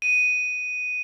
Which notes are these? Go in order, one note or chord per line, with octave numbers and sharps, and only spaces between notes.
D#7